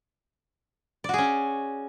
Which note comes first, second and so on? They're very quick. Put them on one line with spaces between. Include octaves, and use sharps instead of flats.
D5 F#4 G#4 C#4